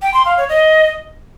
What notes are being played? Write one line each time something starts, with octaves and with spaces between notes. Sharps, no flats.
G5
C6
F5
C#5
D#5